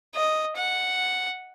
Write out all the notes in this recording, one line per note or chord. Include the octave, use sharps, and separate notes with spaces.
D#5
F#5